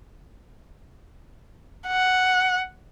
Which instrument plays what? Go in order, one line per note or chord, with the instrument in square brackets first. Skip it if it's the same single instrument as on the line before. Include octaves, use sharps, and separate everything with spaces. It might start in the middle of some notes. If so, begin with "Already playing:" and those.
[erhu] F#5